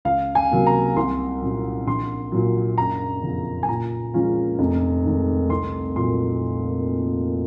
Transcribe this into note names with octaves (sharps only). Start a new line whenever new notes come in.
C#2 F5
G#5
C3 F#3 A#3
A#5
C2 C6
A#2 F#3 C#4
A#1 C6
A#2 F#3
F#1 A#5
F2 C#3
G#5
A#2 A#5
F3 G#3 C#4 F4
F1
D#2 D#3 G#3
C2 C6
A#2 F#3 C6